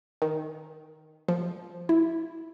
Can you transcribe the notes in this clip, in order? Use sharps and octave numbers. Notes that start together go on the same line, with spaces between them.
D#3
F3
E4